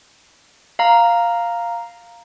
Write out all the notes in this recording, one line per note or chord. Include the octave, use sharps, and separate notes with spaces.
F5 A#5